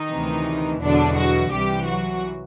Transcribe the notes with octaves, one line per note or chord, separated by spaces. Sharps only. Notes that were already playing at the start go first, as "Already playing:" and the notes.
Already playing: D#3 D#4
D2 C3 E3
E2 B2 D3 F#3 D4
F#3 F#4
C2 C3 E3 G3 G4
F#3 F#4